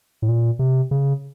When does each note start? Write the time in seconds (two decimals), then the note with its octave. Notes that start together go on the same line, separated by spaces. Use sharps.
0.22 A2
0.29 A#2
0.59 C3
0.91 C#3